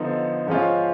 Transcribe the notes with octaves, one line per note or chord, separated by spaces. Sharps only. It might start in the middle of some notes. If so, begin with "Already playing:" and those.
Already playing: D3 F3 B3 D#4
G#2 F3 G#3 C#4 F4